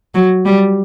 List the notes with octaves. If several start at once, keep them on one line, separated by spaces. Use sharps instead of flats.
F#3
G3